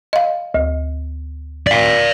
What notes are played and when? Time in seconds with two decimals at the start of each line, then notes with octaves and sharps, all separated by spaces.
0.13 D#5 F5
0.54 D2
1.67 D5 F5